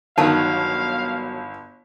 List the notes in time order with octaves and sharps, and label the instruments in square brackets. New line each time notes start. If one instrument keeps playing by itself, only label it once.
[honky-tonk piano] G1 [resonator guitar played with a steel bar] D#3 F#3 [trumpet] F5 [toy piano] A5